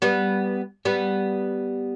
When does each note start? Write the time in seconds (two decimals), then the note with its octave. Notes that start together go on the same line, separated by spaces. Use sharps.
0.02 G3 B3
0.85 G3 B3